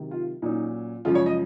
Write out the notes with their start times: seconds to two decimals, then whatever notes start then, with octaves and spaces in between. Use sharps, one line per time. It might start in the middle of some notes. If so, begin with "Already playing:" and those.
Already playing: C3 D#3 F#3
0.11 F4
0.42 A#2 F#3 C#4 D#4
1.05 F#2 C#3 F3 G#3 C#4 F4
1.15 C#5
1.26 D#5